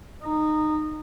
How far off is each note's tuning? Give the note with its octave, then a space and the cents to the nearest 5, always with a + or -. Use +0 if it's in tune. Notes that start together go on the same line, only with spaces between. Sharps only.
D#4 -20